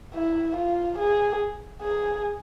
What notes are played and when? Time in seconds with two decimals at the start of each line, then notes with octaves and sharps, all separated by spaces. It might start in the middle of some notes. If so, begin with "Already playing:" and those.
0.14 E4
0.56 F4
0.98 G#4
1.82 G#4